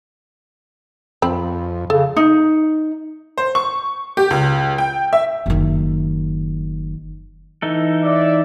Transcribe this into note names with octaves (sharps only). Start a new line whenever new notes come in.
F2 C4 B5
C#3 A4
D#4
C5
C#6
G4
C#2
G5
E5
F#1 D#3
E3 D#4 A4
D5 E5